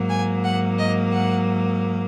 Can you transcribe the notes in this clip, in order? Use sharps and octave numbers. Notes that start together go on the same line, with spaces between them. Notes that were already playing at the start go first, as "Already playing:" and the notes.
Already playing: G#2 F#3 A#3
G#5
F#5
D#5
F#5